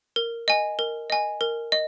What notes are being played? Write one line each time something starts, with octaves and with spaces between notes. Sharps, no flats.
A#4
D#5 G#5
A#4
D#5 G#5
A#4
D#5